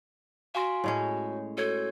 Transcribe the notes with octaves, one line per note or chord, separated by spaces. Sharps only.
F#4 F5 G#5 C6
A2 G#3 C#4 C#5
F#4 A4 C#5 G#6